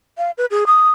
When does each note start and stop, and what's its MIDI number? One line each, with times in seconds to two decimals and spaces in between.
0.18 0.31 77
0.38 0.46 71
0.51 0.64 68
0.67 0.91 87